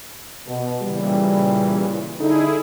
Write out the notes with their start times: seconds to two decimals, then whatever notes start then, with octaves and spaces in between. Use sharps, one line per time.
0.47 B2
0.82 A#2 C#3 E3 G3
2.19 D3 D#4 E4 G#4